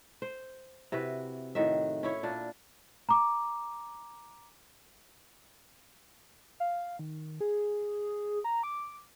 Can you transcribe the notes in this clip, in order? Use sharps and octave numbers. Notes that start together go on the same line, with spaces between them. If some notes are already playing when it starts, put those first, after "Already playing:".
C5
C3 E4 F#4 B4
A2 D#3 F#4 E5
C#4 E4 C#5
A#2 D4
A#5 D6
F5
D#3
G#4
A#5
D6